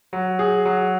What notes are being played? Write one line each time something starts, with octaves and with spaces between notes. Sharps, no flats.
F#3
G#4
F#3